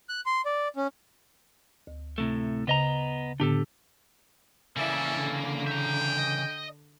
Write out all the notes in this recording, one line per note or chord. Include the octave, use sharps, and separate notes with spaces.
F#6
C6
D5
C#4
D2
A2 C3 A3
C#3 B3 D#5 A#5
A2 D3 B3 D4 G4 A4
C#3 E3 A#3 E4 A4 D5 E5
D3
E5 G5 A#5
D#5